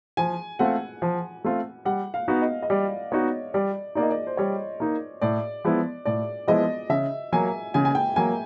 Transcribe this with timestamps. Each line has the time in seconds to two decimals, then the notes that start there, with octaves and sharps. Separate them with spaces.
0.17 F3 G#5
0.59 A3 C4 F4 F#5
1.02 F3
1.44 A3 C4 F4
1.85 G3 F#5
2.14 F5
2.28 B3 D#4 F#4
2.42 D#5
2.62 D#5
2.70 G3 D5
3.12 B3 D#4 F#4 C#5
3.54 G3 D5
3.95 A#3 D#4 D5
4.03 D#5
4.10 D5
4.27 C5
4.37 G3 C#5
4.80 A#3 D#4
5.21 A2 D5
5.65 F3 G#3 B3 E4
6.05 A2 D5
6.47 F3 G#3 B3 E4 D#5
6.90 C#3 E5
7.33 F#3 A#3 G#5
7.74 C#3 G#5
7.85 G#5
7.95 G5
8.16 F#3 A#3 G#5